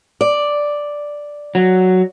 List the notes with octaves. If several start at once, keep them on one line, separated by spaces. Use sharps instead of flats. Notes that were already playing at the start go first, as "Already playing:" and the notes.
D5
F#3